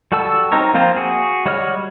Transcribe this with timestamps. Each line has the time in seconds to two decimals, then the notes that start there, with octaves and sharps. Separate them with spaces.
0.12 G3 F#4 A4 A5 E6
0.52 C4 D#4 A#4 C#5
0.74 F3 A#3 C4 F4 C5
0.96 F#4 G#4
1.46 G3 F#4 C#5 D#5 F6